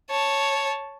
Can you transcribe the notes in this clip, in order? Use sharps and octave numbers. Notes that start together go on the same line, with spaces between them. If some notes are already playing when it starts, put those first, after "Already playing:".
C#5 A5